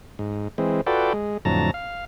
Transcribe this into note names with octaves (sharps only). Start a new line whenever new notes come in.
G#2
E3 G#3 C4
F4 F#4 A4 B4 D5 G5
G#3
F2 A2 D3 F#3 A5 A#5
F5